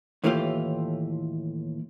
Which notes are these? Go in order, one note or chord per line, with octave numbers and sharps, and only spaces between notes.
D#2 A2 E3 A3 F4 G4